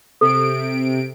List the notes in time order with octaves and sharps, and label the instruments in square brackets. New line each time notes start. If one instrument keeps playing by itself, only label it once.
[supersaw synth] C3 D7 [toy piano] A4